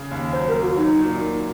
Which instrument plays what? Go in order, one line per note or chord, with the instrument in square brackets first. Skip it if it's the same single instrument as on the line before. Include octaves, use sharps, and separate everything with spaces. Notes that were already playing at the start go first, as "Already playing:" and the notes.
Already playing: [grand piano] C#3
D#2
[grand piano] F#3 [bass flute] C5
[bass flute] A#4
[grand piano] D#2
[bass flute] F#4
[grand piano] F#3 [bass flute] D#4
[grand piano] A#2
A#3